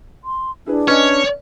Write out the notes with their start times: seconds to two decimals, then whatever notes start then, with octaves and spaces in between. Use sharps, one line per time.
0.24 C6
0.66 D4 E4 G#4 B4
0.88 C#4 B4 C#5 D#5 G#5